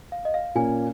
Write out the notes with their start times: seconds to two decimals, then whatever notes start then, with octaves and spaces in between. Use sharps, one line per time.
0.12 F5
0.25 D#5
0.34 F5
0.55 A#2 A#3 C#4 G#5